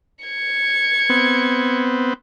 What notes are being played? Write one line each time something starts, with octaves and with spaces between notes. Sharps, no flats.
G#6 C#7
B3 C4